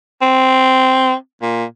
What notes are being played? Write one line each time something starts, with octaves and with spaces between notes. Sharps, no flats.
C4
A#2